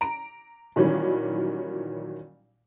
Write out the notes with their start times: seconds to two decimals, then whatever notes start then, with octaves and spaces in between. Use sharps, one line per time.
0.01 A#5 D7
0.76 A#2 D#3 E3 F#3 G3 C#4